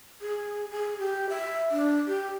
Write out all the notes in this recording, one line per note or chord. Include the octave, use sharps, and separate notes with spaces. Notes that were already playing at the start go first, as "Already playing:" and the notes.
G#4
G#4
G4
E5
D4
G4